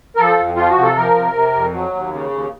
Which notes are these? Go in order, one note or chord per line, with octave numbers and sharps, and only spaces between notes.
A#4
F3 A4
F2
F3 F4
F#4
C3
A4
F3 A#4
C3
C3
F2
F#3
D#2
C#3
D#2